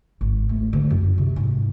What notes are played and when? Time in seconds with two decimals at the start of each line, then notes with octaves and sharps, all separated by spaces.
0.21 G#1
0.49 A3
0.73 D3
0.90 F#2
1.18 C3
1.36 G#2